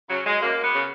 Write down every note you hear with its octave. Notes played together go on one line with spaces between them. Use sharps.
C#3 F#3
G#3
F#2 A#3
B3
C#3